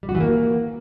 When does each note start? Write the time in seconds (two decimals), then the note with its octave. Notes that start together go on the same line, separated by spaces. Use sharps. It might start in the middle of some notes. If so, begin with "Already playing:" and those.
0.03 G3
0.09 F#4
0.15 E3
0.20 A#3